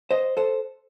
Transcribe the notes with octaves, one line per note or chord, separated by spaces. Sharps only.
C5 D#5
A4 C5